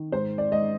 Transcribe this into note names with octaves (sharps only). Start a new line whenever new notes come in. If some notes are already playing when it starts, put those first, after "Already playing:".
Already playing: D#3
G#2 C5
D5
G#2 D#5